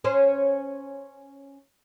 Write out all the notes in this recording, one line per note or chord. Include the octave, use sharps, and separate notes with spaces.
C#4 C5